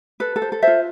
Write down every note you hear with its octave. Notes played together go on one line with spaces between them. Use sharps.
A4 B4
A4
C5
A4
F4 C5 E5